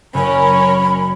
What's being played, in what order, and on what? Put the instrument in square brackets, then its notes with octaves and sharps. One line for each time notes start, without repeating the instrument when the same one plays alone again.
[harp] F#1 [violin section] C#4 A#4 C#5 [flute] B5